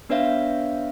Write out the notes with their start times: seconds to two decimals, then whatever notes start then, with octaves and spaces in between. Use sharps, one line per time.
0.09 B3 D4 B4 C#5 E5 F5